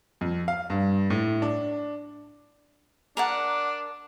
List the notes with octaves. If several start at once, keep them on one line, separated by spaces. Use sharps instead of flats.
F2
F5
G2
A2
D4
D4 A#4 D5 F#5